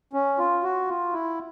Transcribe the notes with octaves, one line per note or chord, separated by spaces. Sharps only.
C#4
F4
F#4
F4
E4